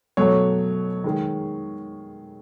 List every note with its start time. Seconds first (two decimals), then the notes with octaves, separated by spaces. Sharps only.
0.17 B2 F#3 A3 C#5
1.04 D#3 G#3